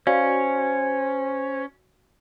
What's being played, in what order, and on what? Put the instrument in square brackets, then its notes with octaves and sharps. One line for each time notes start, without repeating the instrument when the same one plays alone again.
[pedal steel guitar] C#4 [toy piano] F#4 D5 F5 [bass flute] C5